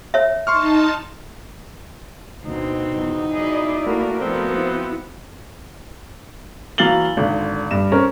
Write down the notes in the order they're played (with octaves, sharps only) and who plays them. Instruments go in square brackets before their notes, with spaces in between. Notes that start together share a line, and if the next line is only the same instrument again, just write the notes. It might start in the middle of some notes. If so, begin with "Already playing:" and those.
[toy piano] C#5 E5
[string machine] D#4 A5 [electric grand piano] C6 C#6 F6
[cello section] D2 [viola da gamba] B2 C4 [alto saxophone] D#4
[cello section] E2
[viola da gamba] F#3 G#4 D#5 [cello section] E4 D5
[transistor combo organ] A3 A#4 [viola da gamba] A#3 [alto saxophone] F#4
[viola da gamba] F3 B3 F#4 [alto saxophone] C4
[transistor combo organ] E4
[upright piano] E3 F#3 F5 A6 F#7 G7
G#1 D3
G2 E7
C4 C#4 A#4